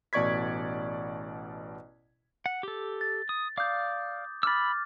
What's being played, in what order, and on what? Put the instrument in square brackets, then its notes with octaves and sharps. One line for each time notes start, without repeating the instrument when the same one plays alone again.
[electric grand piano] A1 B2 D5 C#6 G#6 B6
[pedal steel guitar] F#5
G4 A4
[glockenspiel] A6
[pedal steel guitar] D#6
[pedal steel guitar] D5 F5 [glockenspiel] D6 D#6 G6
[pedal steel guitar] B5 E6 [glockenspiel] D6 F6 A6